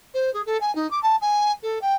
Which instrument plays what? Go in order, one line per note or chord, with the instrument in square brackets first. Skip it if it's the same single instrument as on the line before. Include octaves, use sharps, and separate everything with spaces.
[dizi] C5
G#4
A4
G#5
D#4
D6
A5
G#5
A4
G5